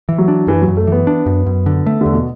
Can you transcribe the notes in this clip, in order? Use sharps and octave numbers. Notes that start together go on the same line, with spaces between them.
E3
F#3
D4
F#2 E3
F#3
F#2
A3
E3 B3
D4
F#2
F#2
D3
A3
E2 D3
B2